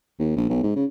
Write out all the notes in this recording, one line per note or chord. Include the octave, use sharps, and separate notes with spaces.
D#2
A#1
B1
G#2
C#3